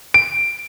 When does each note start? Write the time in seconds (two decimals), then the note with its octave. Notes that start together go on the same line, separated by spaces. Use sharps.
0.14 D7